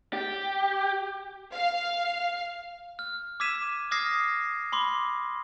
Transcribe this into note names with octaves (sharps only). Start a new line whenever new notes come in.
G4
F5
F6
D6 E6 G#6 B6 D#7 E7
D6 D#6 F6 G#6 A#6 C7
B5 C6 D6